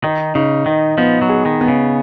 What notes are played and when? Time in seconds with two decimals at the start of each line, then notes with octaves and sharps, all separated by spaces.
0.04 D#3 D#4
0.35 C#3 D#4
0.66 D#3 D#4
0.98 F3 B3
1.22 F#3
1.29 G#4
1.46 D#3
1.61 B3
1.68 C#3